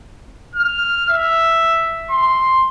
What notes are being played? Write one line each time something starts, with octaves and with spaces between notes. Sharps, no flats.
F6
E5
C6